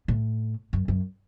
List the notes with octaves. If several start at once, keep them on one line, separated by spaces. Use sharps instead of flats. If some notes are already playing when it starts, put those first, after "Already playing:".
A2
F#2
F#2